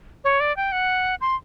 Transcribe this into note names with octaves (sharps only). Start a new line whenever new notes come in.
C#5
D5
G5
F#5
C6